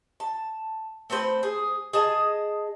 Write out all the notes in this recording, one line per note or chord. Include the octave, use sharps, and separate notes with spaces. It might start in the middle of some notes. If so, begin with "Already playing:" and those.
A5
A3 C4 B4 C5
G#4
G#4 D#5 A5